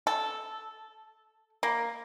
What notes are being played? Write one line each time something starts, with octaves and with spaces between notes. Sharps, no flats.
A4
A#3